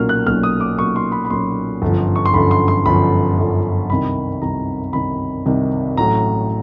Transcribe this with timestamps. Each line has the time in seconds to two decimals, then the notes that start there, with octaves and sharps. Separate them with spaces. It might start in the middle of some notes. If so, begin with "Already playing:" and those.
Already playing: B1 A#2 F#3 A#3 C#4 F6
0.09 F#6
0.26 B1 A#2 F#3 A#3 C#4 F6
0.43 D#6
0.61 D6
0.78 B1 A#2 F#3 A#3 C#4 C#6
0.96 C6
1.12 B5
1.25 B5
1.30 B1 A#2 F#3 A#3 C#4 C6
1.82 G1 F#2 D3 F3
2.16 C#6
2.25 C6
2.34 G1 F#2 D3 F3 B5
2.51 C6
2.68 C6
2.86 G1 F#2 D3 F3 B5
3.38 G1 F#2 D3 F3
3.90 C2 C3 D#3 B5
4.42 C2 C3 D#3 A#5
4.93 C2 C3 D#3 B5
5.46 C2 C3 D#3
5.97 A1 A2 F#3 A#5